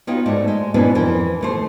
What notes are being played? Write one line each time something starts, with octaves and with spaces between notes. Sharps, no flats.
B3 D#4 F4 F#4 C#5 G5
G#2 A3 D5
G#3
G#2 B2 E3 B3 C#4 D4
F2 E3 A#4
D#2 A3 C5